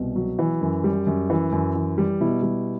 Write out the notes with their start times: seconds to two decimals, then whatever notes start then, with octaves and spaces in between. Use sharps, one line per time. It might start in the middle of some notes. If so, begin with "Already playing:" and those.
Already playing: C2 B2
0.16 F#3
0.39 E3
0.61 F#2
0.84 G3
1.07 F#2
1.30 E3
1.52 F#2
1.75 E3
1.98 G3
2.21 B2 E4
2.43 G3